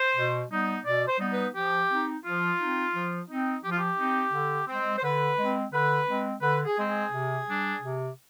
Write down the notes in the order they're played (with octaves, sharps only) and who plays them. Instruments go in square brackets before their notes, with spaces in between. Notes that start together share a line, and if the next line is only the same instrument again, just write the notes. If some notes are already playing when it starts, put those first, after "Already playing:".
Already playing: [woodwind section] C5
B2
G3 B3 D#4
B2 D5
C5
G3 B3 D#4
B4
F3 G4
C4 D#4
F3 F4
C4 D#4
F3
C4 D#4
F3 G4
F4
G4
C4 D#4
D3
G#3 C4
C5
D3 B4
G#3 C4
D3 B4
G#3 C4
D3 B4
G#4
G#3 C4
G#4
C3
G3 D4
C3